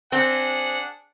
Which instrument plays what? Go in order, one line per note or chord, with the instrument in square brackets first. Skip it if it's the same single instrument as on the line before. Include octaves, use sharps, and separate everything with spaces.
[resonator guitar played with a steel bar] C4 [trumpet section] D4 G#4 F#5